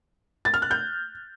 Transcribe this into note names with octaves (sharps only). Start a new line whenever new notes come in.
A6
F6
F#6
G6